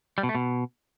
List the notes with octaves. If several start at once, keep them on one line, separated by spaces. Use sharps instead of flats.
G3
B2
A3
B2